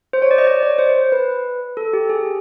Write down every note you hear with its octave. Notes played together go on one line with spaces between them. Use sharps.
C5
C#5
D5
D#5
D5
C#5
C5
B4
A4
G4
G#4